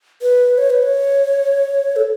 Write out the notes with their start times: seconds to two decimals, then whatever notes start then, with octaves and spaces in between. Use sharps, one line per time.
0.22 B4
0.58 C#5
0.70 B4
0.83 C#5
1.96 A4